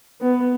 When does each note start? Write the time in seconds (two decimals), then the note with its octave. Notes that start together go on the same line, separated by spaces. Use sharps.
0.21 B3